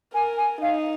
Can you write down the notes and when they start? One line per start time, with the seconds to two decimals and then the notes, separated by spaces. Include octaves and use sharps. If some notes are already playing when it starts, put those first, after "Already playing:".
0.14 A#4 G#5
0.37 G#5
0.61 D#4 F5